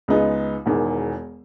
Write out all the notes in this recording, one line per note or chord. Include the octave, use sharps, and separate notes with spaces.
C#2 C#3 G#3 B3 D#4
E1 E2 D#3